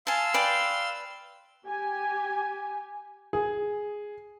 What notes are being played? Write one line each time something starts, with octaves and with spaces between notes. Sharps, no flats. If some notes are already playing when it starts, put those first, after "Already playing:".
F5 G#5 A5 C6 E6
B4 D5 G5
G4 G#5
G#4